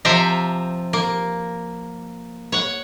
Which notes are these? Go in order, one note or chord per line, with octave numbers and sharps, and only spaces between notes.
C3 F3 E5 F5 G5 A#5
A#3
C#5 F#5